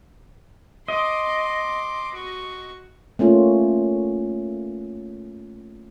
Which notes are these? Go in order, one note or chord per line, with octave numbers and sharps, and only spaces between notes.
D#5 C6 D6
F#4 C#6
A3 A#3 C#4 F4